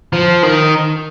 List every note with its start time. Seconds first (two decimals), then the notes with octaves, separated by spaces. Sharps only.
0.13 F3
0.43 D#3